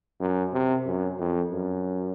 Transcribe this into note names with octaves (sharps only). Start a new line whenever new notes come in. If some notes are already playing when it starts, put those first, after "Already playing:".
F#2
C3
F#2
F2
F#2